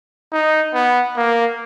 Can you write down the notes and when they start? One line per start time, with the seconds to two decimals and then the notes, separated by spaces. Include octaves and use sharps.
0.33 D#4
0.74 B3
1.17 A#3